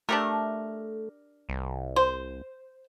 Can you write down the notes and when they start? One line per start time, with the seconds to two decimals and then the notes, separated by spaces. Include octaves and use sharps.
0.09 A3 D4 G4 A#4
1.49 C2
1.96 C5